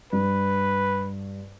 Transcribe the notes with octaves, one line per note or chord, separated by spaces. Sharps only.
G2 B4